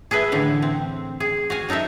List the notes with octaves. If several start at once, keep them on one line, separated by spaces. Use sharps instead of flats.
G#4 A4 B4 E5
A2 D3 E3
C4
G#4
F#4 F5 G#5
F#3 D#4 A4 A#4 E5